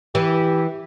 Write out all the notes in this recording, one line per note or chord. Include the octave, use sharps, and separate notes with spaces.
E3 G4